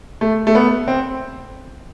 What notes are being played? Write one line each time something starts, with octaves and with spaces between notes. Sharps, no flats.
A3
A3
B3
C4